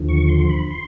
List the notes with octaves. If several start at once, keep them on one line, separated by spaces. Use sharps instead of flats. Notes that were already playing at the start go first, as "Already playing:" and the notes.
Already playing: D#2 D3 F3
C#6
C6
C6
B5
C6